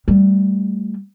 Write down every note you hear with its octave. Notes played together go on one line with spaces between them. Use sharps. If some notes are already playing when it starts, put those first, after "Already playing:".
G3 A3